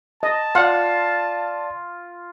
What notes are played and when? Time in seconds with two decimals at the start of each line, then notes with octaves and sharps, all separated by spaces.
0.23 D#5 A5
0.55 F4 D5 F5 F#5